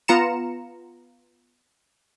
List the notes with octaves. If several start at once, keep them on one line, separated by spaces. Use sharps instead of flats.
B3 F4 A#5 C#7 E7